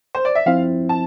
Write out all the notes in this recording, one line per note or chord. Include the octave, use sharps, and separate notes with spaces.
C5
D5
E5
F3 C4 E4 F5
A5